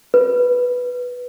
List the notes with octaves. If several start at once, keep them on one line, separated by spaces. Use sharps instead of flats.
B4